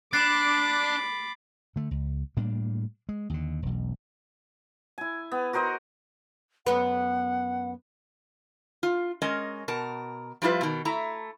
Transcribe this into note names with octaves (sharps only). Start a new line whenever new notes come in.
D4 B5 D6 F#6 A6 C7
D3 A3
C#2
A2 G3 A#3 D4
G#3
D#2 D3
E1 B1
E4 G#5
B3
F#4 A#4 C5 D#5
F#2 B3 B4 F#5
F4
G#3 C#4 A#4 D#5
B2 A#4 A5
F3 G3 E4 F4 B4
B2 D#3
A3 E4 A#5